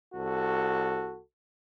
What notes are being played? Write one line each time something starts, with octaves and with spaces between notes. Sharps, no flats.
C2 F#4 A4